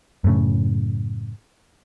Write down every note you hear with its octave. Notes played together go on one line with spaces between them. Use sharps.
F#2 A2 C#3